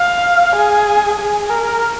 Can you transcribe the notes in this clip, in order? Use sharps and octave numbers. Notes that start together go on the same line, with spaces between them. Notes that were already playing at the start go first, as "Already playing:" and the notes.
Already playing: F5
G#4
G#4
A#4